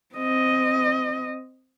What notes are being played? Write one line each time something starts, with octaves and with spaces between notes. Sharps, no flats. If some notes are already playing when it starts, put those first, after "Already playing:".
C4 D#5